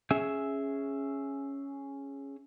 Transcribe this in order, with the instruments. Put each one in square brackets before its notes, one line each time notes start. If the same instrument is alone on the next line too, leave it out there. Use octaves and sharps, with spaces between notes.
[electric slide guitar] C#4 G#4 E5